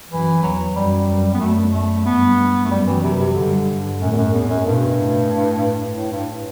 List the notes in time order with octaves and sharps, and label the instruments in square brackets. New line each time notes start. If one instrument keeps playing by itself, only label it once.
[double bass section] F#2 [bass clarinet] E3
[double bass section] E2 [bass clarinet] F#3
[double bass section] F#2 [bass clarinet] G3
[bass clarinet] B3
[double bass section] F#2 [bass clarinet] A3
[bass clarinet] A3
[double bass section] G2 [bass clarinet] B3
[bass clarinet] A3
[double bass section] F#2 [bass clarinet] G3
[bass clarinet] E3
C3
C3
[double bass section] G2 [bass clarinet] D3
[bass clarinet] F#2 [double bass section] A2
[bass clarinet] E2
F#2
E2
F#2
[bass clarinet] G2 [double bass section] B2
[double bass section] A2
[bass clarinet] A2
G2